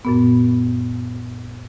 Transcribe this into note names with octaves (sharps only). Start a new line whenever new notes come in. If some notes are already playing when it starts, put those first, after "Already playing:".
F#2 A#2 B3